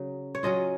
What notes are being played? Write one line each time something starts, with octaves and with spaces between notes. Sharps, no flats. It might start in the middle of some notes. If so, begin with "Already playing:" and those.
Already playing: C#3 F#3
C#5
F#3 C#4 F4 D#5